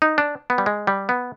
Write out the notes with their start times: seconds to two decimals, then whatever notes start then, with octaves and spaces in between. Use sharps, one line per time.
0.02 D#4
0.18 D4
0.50 B3
0.58 G3
0.66 G#3
0.87 G3
1.09 B3